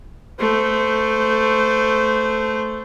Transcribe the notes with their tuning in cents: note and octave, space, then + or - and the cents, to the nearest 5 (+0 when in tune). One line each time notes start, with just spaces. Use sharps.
A3 +0 C5 -20